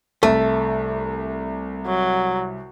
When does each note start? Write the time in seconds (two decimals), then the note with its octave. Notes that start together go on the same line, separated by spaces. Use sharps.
0.23 C2 A3
1.86 F#3